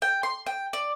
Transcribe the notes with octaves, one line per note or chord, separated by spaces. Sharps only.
G5
C6
G5
D5